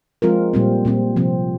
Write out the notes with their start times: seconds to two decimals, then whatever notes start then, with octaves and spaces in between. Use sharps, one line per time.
0.22 F3 G#3 C4 F4 A#4
0.54 A#2 G3 C4
0.85 A#2 G3 C4
1.16 C3 F3 C4